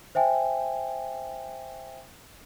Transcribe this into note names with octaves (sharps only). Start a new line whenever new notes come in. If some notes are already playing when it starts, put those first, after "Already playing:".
C5 E5 G5 G#5